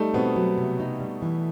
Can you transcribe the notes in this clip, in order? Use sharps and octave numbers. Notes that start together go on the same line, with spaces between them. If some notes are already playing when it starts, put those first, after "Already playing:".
Already playing: G3 A3 D#4
B2 B3 C4
F#3
C3
D#4
G3
E3